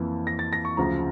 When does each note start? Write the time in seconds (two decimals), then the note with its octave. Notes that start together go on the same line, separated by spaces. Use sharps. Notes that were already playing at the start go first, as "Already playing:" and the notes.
Already playing: F2 E3 A#3
0.27 A#6
0.39 A6
0.53 A#6
0.65 C#6
0.77 D2 C#3 F3 A#5